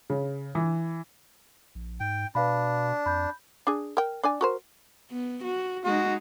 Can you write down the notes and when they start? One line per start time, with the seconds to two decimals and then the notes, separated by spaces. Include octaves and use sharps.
0.10 C#3
0.55 E3
1.75 A#1
2.00 G#2 G5
2.35 B2 D4 B4 F5 B5
3.06 F2 B5 G6
3.67 D4 G#4
3.97 A#4 G5
4.23 D4 D5 G#5
4.41 F#4 A#4 C5
5.11 B3
5.44 F#4
5.85 G#3 D#4 F#4